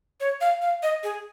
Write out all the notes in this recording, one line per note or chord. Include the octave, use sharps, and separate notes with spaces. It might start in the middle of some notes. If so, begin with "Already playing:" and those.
C#5
F5
F5
D#5
G#4